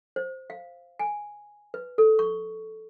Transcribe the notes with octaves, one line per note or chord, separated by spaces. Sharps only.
C5
F5
G#5
B4
A4
C#6